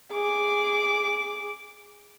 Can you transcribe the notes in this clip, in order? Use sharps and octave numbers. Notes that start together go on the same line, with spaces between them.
G#4 D6